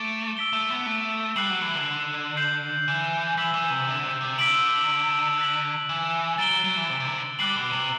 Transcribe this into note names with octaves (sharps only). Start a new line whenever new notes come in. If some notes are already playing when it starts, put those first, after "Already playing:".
Already playing: A3 D6 A6 D7
E6 B6 D7 G7
A3
B3
A3
G3 F#6 C7 F#7
F#3
E3
D3
G6 C7 F#7
E3
E3 E6 B6 F#7
E3
C3
D3
C3
C3
D3 E6 B6 D7 F#7
F#6 B6 F#7
E3
F#3 A6 D7 G7
F#3
F#3
E3
C3
C3
D3
G3 D6 F#6 C7 F#7
B2
C3